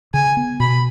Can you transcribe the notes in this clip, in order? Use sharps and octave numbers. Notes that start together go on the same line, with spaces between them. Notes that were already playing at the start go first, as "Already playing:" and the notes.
C#3 G#5
B3
B2 B5